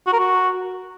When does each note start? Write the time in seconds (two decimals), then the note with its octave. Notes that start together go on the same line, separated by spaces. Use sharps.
0.07 F#4
0.13 A#4
0.19 F#4